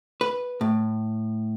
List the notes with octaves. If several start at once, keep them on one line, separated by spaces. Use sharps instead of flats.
B4
A2